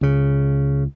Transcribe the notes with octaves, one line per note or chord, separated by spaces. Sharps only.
C#2 C#3